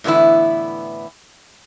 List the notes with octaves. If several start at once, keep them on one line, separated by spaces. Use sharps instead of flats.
A2 D3 E3 B3 E4